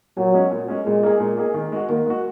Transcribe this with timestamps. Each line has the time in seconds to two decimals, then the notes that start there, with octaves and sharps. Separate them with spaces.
0.17 A#2 F#3
0.34 G#3 C#4
0.51 A#2
0.68 G#3 C#4
0.86 A#2 G#3
1.03 A#3 D#4 G#4
1.20 A#2
1.37 A#3 D#4 G#4
1.54 D#3
1.72 G#3 F#4
1.89 D#3 A#3
2.06 G#3 F#4